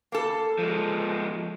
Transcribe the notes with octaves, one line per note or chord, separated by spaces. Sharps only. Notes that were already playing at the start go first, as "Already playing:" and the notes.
A#3 A4
F3 G#3